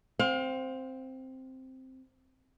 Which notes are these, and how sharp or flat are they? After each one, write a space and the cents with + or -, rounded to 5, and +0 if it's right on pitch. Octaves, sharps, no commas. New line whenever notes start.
C4 +0 F5 +35